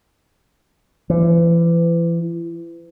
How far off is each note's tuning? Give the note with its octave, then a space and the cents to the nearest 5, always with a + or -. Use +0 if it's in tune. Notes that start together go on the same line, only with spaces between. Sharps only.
E3 +35